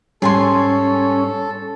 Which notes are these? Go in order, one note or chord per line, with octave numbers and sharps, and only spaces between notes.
G#2 G3 C#4 G#4 A4 G#5 C6